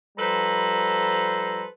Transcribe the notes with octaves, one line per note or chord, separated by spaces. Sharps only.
F3 G3 A4 B4 C5 A#5